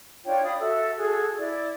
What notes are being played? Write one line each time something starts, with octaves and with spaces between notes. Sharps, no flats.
D4 F4 C#5 G5
D5 F5 B5 D#6
F#4 A4 E5 E6
F#4 G#4 A4
E4 D5